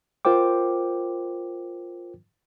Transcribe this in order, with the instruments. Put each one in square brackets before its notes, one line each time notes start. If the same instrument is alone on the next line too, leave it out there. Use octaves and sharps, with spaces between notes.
[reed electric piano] F4 A#4 C5 G5 D6